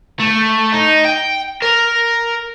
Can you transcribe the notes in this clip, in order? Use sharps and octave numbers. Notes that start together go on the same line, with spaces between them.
A3
D#4
G5
A#4